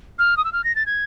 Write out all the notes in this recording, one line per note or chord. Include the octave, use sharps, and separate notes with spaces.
F6
D#6
E6
F6
A#6
A6
G#6